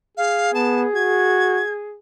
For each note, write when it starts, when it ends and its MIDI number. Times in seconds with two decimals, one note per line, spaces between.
0.17 1.98 68
0.17 0.52 77
0.54 0.87 59
0.54 0.81 81
0.95 1.63 66
0.95 1.73 92